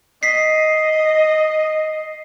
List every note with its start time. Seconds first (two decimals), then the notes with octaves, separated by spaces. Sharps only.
0.23 D#5 B6 C7